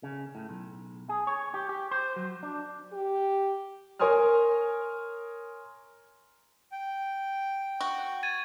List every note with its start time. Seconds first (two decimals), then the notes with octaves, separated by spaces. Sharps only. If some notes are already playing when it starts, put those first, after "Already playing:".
0.03 C#3
0.35 A2
0.49 B1
1.09 G#4
1.27 C#5
1.54 G4
1.69 G4
1.91 C5
2.16 F#3
2.43 D4
2.93 G4
3.99 A#4 C#5 G#5 C6 D#6 F6
6.72 G5
7.80 F#4
8.23 G#6 A6 D#7